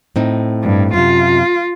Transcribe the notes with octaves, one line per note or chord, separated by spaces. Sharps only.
A2 C4 D#4
G2
F#2 A2 C3 F4